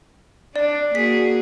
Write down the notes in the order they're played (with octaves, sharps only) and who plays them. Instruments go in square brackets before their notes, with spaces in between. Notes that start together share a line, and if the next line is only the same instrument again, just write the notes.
[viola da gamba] D4 [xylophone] D5
[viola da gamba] A#3 F#4 G#4 [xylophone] B6